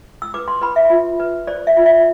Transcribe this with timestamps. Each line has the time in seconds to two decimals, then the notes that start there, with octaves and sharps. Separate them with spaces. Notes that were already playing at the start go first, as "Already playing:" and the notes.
0.22 E6
0.34 B4 D6
0.48 C6
0.62 B4 B5
0.76 E5
0.90 F4
1.20 B4
1.47 C5 D5
1.67 E5
1.77 F4
1.86 E5